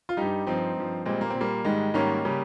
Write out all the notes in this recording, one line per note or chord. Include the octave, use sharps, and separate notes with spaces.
F4
G2 G3 D#4 G4
G2 F3 C4 D#4
G2 F3
A#2 G3 G#3 C4
A#3
A#2 C4
G3 A#3
G#2 D#3 G3 G#3
G#2 D#3 G3 A#3 C#4
C#3 G3